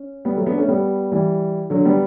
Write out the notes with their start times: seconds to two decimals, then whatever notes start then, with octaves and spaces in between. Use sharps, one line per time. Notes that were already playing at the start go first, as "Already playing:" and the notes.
Already playing: C#4
0.25 G3 B3
0.37 F#3 A3
0.46 B3 D4
0.57 A3 C#4
0.68 G3 B3
1.12 E3 G3
1.70 D3 F#3
1.85 G3 B3